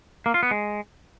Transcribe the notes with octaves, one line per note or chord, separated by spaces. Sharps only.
A#3
F4
B3
G#3